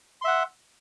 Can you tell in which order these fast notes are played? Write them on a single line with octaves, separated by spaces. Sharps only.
C6 E5 F#5